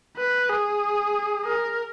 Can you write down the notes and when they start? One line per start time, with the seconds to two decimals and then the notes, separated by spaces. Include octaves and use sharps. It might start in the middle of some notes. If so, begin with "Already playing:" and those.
0.17 B4
0.49 G#4
1.45 A#4